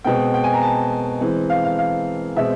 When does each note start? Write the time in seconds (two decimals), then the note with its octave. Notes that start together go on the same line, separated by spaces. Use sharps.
0.04 B2 G#3 C4 G5
0.34 G5
0.44 G#5
0.54 A#5
0.63 A5
1.21 E3 G#3 C4
1.50 F5
1.64 F5
1.78 F5
2.36 B2 G#3 C4 E5